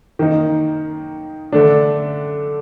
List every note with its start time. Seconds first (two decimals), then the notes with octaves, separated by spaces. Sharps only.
0.19 D#3 A#3 D#4
1.52 D3 A3 D4